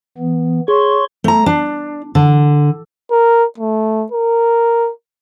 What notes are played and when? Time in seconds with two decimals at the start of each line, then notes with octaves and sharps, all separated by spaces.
0.18 E3 B3
0.68 G#4 C#5 C6 C#6
1.24 A3 A#5
1.46 D4
2.15 D3
3.11 A#4
3.58 A3
4.12 A#4